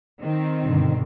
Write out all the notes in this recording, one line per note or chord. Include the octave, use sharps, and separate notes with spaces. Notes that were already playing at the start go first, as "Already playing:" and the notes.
D#3 C4
G2 B2 D3